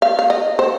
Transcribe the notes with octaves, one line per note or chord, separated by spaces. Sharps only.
F5
F5
D#5
C5